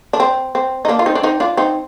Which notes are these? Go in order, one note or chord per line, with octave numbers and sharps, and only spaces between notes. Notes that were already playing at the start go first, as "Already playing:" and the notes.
D4
C4
C4
D#4
A#3 D4
F4
C4 D#4
D4
C4 D#4
D4 F4
C4 D#4